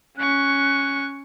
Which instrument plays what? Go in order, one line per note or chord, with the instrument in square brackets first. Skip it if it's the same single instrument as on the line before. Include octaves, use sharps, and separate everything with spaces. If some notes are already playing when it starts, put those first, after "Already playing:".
[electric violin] C#4 C#6 [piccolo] F#6